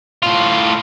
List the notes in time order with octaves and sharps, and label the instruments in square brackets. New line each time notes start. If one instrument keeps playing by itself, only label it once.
[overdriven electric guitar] A2 F4